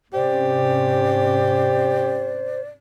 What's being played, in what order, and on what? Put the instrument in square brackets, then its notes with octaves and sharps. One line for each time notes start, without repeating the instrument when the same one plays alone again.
[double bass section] G#2 C3 C#4 [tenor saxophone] G4 [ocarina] C5 [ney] D5